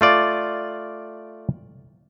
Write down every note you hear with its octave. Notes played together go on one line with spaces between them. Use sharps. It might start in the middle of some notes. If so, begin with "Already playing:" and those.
A3 F4 D5